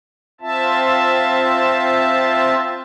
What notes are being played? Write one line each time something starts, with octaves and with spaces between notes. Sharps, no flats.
C4 F4 E5 A5